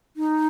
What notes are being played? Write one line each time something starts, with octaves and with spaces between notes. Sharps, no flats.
D#4